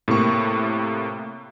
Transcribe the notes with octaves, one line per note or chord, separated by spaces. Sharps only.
A2 C3 A#3 C#6